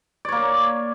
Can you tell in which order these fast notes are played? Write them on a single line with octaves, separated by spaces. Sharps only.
D5 C#5 A#3